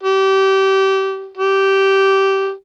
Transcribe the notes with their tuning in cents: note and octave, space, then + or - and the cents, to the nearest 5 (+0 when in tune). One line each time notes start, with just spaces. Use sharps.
G4 -25
G4 -15